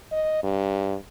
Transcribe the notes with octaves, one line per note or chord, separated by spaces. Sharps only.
D#5
G2